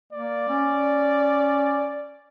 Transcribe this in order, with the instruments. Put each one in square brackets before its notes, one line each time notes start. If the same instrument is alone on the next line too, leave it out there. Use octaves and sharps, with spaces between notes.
[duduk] A#3 [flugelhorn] D5
[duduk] C#4